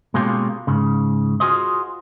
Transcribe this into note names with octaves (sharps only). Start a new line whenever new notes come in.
B2 G#3 A#3 C#4 F4 G4
G#2 C#3
F4 F#4 G#4 C5 D#5